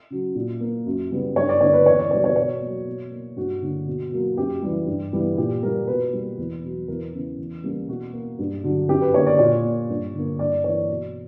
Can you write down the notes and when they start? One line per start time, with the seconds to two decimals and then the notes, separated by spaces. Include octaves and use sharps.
0.10 C#3 F#3
0.35 A#2
0.60 A#3
0.86 F#2
1.11 C#3 G3 B3
1.36 G2 C#5
1.49 D5
1.61 D3 A#3 C#5
1.73 B4
1.86 E2 C#5
1.99 D5
2.11 B2 G3 C#5
2.24 C#5
2.36 B2 C#5
2.62 F#3 A#3
2.87 B2
3.11 A#3
3.36 G2 F#4
3.62 D3 A#3
3.87 B2
4.12 F#3 A#3
4.37 F#2 G4
4.62 E3 G3
4.87 G2
5.13 E3 G3 B3
5.38 A#2 G4
5.63 G3 A#3 A#4
5.87 B2 B4
6.13 G3 A#3
6.38 E2
6.63 B2 F#3
6.88 E2 A#4
7.13 C#3 E3 B3
7.38 E2
7.64 C#3 G3 A#3
7.88 B2 F#4
8.13 A#3
8.39 G2
8.64 D3 F#3
8.89 F#2 G4
9.02 B4
9.13 D3 A#3 C#5
9.27 D5
9.39 A#2 C#5
9.65 A#3
9.89 G2
10.14 D3 A#3
10.39 G2 D5
10.64 E3 A#3 C#5
10.89 B2